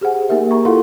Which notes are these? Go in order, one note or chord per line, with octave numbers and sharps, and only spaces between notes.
G4 G#4 C5 F#5 G#5
A#3 D#4 G4 A#4 E5
A#5 C#6
E4 F4 A4 F5 F#5 C6